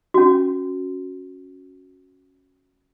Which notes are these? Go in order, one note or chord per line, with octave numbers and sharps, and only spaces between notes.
C#4 F#4